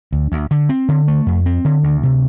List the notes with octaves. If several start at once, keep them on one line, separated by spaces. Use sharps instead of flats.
D2
D2
D3
C4
D3
A3
F2
C4
D3
D2
C3